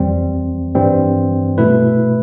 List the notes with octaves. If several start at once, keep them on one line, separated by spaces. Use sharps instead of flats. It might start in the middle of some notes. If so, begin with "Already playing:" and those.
Already playing: F2 E3 G3 C4
G2 E3 G3 C4
B2 A3 E4 B4